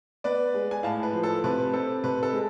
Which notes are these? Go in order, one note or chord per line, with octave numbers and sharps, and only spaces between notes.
B3 B4 D5
G#3
G#5
A2 F5 A5
B4
F3
A4
C3 B4
C4 A4
C3 B4
A4
G#3